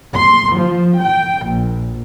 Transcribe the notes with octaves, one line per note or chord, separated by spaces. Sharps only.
C6
F3
G5
A#1